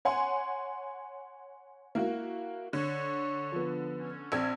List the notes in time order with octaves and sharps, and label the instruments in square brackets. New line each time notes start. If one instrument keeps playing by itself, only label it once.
[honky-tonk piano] C#5 F#5 G#5 C6
A#3 E4 F#4
[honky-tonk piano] D3 [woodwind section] C#5
[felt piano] F3 B3
[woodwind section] C#4
[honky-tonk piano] A#1 E6 G#6 [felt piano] C4 D5